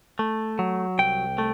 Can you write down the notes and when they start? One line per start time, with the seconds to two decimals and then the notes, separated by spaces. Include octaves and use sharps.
0.19 A3
0.59 F#3
0.99 C2 G5
1.38 A3